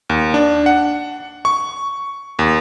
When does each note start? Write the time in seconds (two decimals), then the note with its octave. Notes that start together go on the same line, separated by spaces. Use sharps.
0.10 D#2
0.34 D4
0.66 F#5
1.45 C#6
2.39 D#2